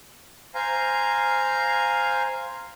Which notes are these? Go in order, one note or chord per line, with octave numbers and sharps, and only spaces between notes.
C5 F5 G#5 A#5